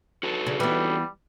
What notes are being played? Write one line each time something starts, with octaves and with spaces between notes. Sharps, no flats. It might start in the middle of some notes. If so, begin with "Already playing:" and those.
F#4 A4 B4
C#3
E3 G3 B3